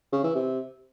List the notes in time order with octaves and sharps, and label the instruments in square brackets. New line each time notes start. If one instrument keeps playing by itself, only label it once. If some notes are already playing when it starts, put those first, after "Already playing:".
[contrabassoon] C#3
E3
C3